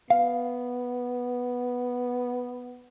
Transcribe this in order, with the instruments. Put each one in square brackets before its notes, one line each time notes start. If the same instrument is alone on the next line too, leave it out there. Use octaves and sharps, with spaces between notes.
[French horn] B3 [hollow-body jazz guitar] F5